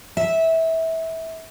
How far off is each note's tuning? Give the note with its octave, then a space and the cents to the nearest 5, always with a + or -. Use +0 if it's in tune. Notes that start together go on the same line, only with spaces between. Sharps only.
E5 -20